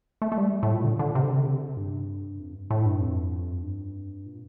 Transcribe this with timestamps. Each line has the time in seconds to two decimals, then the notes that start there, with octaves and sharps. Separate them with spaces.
0.22 A3
0.32 A3
0.38 G3
0.63 A2
0.74 A#2
0.84 D3
0.99 D3
1.15 C3
1.23 D3
1.32 C3
1.39 D3
1.47 C3
1.77 G2
2.39 F2
2.55 G2
2.71 A2
2.86 G2
3.01 F2
3.63 G2
4.26 A#2